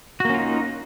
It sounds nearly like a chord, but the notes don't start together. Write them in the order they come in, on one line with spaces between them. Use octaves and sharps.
F#4 A#3 C#4 F4 D#4